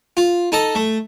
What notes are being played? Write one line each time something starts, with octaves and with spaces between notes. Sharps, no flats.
F4
D#4 A4 D#5
A3